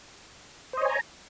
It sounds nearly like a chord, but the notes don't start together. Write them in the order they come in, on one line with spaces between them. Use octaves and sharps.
C5 D#5 C#5 G#5 A#5